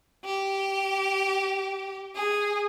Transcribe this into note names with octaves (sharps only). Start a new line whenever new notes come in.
G4
G#4